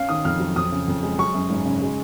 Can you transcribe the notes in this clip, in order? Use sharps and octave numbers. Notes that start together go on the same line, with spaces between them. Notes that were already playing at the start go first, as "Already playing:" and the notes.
Already playing: C#4 F5
D#3 D#6
F2 F6
F#3
F2 D#6
C#3
F2
G#3
F#3 C#6
F#2
G#1
C#3
G#3